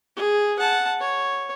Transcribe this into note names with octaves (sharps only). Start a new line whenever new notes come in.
G#4
F#5 A5
C#5